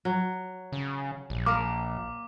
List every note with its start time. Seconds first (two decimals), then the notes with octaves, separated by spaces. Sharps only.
0.05 F#3
0.72 C#3
1.30 A#1
1.46 A#3 A#4 D6